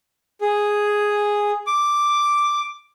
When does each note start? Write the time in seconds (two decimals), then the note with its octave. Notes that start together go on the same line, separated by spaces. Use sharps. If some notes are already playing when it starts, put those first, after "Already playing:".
0.41 G#4
1.67 D6